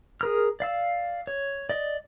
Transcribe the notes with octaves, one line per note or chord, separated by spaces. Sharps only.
G#4 A#4 F6
D5 F5 E6
C#5
D5 D#5